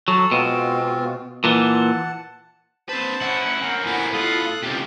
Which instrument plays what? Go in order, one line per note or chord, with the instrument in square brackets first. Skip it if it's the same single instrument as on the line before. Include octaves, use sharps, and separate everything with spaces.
[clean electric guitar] F#3 [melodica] A4
[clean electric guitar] B2 [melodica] G#3 C4 F4
[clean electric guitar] A#2 E3 [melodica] F#5 A5
[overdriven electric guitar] C4 B4 [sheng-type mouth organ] C5 A5
[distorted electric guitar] C#4 E4 [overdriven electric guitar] F#5
[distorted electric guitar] C4 A#4 [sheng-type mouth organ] C#4
[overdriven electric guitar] A2 B3 [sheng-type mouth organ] F#5 G#5
[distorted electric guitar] F4 [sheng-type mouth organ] A4 D#6 F#6
[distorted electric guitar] C#2 C3 [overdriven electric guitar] F4 G4